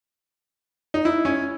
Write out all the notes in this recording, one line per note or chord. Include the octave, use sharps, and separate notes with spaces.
D#4
E4
C#4